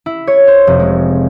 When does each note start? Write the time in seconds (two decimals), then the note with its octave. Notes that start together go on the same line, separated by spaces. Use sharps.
0.06 E4
0.27 C#5
0.47 C5
0.67 F1
0.80 G#3